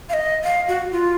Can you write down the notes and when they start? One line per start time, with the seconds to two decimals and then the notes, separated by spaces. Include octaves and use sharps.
0.09 F5
0.14 D#5
0.44 F5
0.68 F#4
0.92 F4